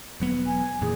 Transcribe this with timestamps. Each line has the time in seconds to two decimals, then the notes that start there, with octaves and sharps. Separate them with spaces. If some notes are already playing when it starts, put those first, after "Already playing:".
0.20 E1 F#3 B3
0.46 G#5
0.81 F2 A#2 E3 G#4